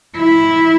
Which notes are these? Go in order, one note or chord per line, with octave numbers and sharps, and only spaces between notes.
E4